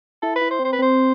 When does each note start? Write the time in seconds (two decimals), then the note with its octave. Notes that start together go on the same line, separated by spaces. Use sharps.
0.22 E4 A4
0.36 B4
0.41 E4
0.50 C5
0.59 C4
0.64 C5
0.73 B4
0.79 C4 C5